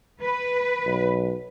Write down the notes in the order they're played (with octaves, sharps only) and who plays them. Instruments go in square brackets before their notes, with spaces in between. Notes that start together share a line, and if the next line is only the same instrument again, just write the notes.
[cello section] B4
[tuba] B1